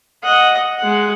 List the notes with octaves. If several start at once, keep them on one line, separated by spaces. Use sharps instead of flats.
D#5 F#5
G#3 F#5